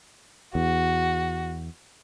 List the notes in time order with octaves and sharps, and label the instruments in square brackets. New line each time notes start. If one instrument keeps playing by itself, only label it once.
[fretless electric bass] E2 [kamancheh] F#4